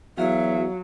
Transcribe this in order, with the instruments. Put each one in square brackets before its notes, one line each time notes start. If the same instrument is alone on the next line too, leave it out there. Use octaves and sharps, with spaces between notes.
[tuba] E2 [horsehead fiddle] F#3 [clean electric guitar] F#4 F5 [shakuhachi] E5